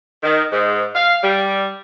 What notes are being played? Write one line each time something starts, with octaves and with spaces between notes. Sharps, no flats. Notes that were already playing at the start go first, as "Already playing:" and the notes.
D#3
G#2
F5
G3